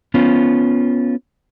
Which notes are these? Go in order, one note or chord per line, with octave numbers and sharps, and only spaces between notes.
B3 C#4 F4